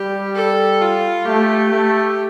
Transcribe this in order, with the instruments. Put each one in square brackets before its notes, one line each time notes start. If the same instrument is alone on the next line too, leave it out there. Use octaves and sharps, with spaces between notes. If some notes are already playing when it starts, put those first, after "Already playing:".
Already playing: [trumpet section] G3 [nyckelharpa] G4
[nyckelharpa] A4
F4
[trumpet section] A3 [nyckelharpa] G4
[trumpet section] A3